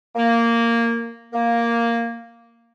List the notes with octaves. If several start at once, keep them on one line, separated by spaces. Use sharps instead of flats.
A#3
A#3